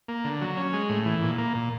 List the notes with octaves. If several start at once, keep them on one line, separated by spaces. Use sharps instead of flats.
A#3
D3
F#3
C#4
G#3
A2
E3
A#2
A#3
A#2